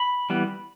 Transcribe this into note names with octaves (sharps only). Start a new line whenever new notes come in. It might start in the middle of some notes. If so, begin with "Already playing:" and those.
Already playing: B5
E3 G3 B3